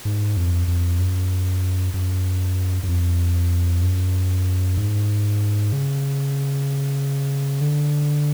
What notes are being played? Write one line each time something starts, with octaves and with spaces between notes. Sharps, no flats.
G#2
F2
F2
F#2
F#2
F#2
F2
F#2
G#2
C#3
D3